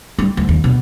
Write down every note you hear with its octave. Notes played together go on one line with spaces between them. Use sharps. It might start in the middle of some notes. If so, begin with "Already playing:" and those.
G3
D2
D#2
B2